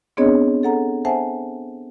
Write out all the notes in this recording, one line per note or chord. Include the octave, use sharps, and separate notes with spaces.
B3 C4 D4 G#4 C#5 D#5
A4 F#5 A#5
C5 E5 F#5 G#5 A5